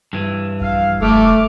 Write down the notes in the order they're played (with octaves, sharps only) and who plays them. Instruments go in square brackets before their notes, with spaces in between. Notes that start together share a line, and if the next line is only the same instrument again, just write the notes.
[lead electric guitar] G2 E3
[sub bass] A#1 [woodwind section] F5
[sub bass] F1 [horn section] A3 [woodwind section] D6 F6